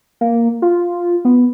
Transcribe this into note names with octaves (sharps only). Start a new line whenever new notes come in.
A#3
F4
B3